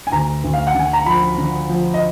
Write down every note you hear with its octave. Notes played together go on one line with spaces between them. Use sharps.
G#5
D2 A#5
D2
F5
F#5
D3 G#5
A#5
F3 B5
D3
F3
D#5